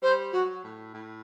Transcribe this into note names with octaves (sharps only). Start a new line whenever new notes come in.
G3 C5
F#3 F#4
A2
A2